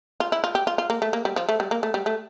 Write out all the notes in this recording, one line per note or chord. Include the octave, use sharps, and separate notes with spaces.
F4
E4
F4
G4
F4
F4
A#3
A3
A#3
G3
F3
A3
G3
A#3
A3
G3
A3